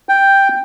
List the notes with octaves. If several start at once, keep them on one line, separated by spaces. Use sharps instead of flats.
G5